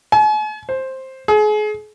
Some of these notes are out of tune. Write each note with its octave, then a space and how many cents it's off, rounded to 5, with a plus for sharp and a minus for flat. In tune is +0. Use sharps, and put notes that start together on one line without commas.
G#5 +45
C5 +10
G#4 +35